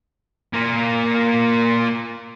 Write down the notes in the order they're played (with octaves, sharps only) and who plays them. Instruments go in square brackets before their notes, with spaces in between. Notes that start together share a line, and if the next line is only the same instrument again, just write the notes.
[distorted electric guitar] A#3 F4